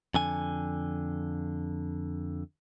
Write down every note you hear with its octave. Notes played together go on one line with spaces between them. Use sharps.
F2 D3 G#5